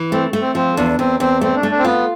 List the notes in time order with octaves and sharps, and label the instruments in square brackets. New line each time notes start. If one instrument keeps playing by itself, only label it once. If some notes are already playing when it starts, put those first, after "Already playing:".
Already playing: [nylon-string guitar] E3
[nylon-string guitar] A3 [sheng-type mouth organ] C4
[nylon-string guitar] A3
[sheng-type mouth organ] C4
[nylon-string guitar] F3 [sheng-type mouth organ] C4
[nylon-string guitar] E2 [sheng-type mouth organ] D4
[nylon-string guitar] E2 [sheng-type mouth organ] C4
[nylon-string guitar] E2 [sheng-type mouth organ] C4
[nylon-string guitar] A3 [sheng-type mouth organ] C4
[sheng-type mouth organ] D4
[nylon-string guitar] A3
[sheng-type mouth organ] D4
C4
[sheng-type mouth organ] B3 [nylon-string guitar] F4